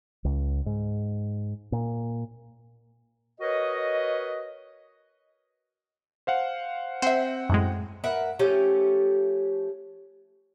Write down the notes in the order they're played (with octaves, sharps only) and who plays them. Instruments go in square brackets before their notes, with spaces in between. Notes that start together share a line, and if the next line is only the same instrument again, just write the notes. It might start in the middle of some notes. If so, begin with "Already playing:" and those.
[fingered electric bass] C#2
G#2
A#2
[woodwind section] F#4 A#4 B4 C#5 D#5
[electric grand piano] C5 F5 F#5
[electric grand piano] C4 F#5 [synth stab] C5 E5
[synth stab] F#2 A2 G#3
[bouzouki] A#4 B4 E5 F#5
F3 A3 C#4 G4